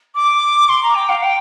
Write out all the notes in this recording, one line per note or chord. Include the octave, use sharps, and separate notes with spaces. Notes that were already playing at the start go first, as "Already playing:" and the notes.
D6
C6
A#5
G5
F5
G5